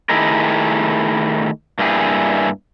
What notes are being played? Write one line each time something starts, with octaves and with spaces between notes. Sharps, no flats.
D#3 A3 E4 G4 G#4 A#4
G2 A#3 E4 G4 G#4